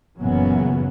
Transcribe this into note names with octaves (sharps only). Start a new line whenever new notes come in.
F#1 A#2 C#3 E3 F#3 B3